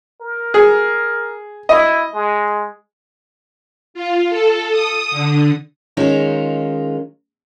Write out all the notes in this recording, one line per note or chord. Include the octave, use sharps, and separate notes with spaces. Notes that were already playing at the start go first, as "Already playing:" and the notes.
A#4
G#4
E4 D#5
G#3
F4
A4
D#6
D3
D#3 G#3 C#4 D#4 F4